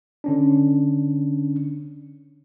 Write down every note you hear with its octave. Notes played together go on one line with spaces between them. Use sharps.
D3 C#4 D4